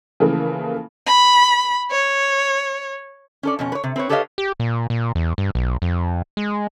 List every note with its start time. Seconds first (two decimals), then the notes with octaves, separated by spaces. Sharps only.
0.20 C#3 E3 F3 A3 A#3
1.06 B5
1.91 C#5
3.43 C#4 A4 D5
3.59 F2 B2 C#4
3.72 B4 C#5
3.84 C3
3.96 C4 B4 C#5
4.09 G4 A4 B4 C#5 D#5 F5
4.38 G4
4.60 A#2
4.90 A#2
5.15 E2
5.38 G2
5.55 B1
5.82 F2
6.37 G#3